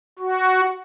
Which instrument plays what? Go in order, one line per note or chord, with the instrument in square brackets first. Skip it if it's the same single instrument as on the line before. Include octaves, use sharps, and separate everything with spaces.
[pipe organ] F#4